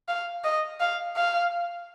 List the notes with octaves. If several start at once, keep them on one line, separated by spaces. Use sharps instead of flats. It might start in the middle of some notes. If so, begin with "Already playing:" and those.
F5
D#5
F5
F5